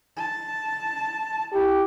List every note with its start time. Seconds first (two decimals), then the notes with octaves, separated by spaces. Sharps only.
0.16 A5
1.53 E4 G4